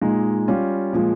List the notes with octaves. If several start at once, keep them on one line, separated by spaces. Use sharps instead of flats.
A#2 G#3 D#4
G3 C#4 F4
A#2 F3 G#3